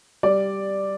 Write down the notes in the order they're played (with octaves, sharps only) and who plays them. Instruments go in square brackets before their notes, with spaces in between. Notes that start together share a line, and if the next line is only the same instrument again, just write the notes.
[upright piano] G3 D5